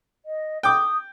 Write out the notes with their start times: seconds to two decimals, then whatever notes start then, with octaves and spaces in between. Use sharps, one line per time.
0.25 D#5
0.63 G5 D6 D#6